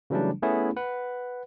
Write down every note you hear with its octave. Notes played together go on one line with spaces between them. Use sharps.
C#3 E3 F#3 G3 A3 D4
A3 B3 C#4 E4 G#4
B4 F#5